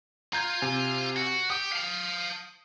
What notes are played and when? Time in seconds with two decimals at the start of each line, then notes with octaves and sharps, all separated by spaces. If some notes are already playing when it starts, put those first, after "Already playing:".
0.33 F4 A#5 G6 G#6
0.62 C3 G#5
1.16 F#4
1.50 G4 D#6
1.72 F5 A5